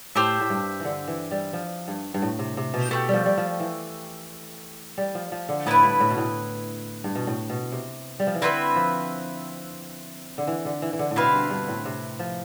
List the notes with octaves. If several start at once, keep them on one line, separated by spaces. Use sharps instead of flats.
A2 G4 C5 E5 A5
A2
G2
D3 E3
E3
G3
F3
G2
G2
A2
C3
C3
B2
B2 A3 E4 G4
F3 G3
G3
F3
E3
G3
F3
F3
D3
A2 B3 E4 B4
G2
A2
B2
A2
G2
B2
A2
B2
C3
G3
F3
E3
D3 C4 E4 B4 E5
F3
D3
E3
D3
E3
E3
D3
A2
B2 C4 E4 B4 F5
G2
G2
A2
C3
F3